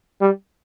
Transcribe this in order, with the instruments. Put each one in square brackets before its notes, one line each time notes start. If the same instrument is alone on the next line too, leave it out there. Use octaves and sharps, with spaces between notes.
[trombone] G3